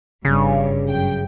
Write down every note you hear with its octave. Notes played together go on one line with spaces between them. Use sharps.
G1 G2 C#3
F#2 G5